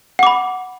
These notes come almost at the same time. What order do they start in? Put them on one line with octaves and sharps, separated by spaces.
F#5 D6 B5